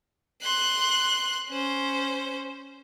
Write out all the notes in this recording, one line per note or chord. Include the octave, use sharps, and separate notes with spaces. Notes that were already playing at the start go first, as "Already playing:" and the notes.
C6 F#6
C#4 C5